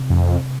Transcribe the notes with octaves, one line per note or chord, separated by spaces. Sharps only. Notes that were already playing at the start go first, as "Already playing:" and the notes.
Already playing: C3
F2